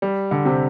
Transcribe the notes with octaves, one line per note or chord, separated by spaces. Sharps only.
G3
D3
C3